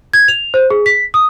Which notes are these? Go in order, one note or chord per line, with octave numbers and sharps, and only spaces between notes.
G#6
F7
C5
G#4
B6
D#6